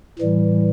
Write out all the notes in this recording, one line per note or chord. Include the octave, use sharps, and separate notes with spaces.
A2 E3 G3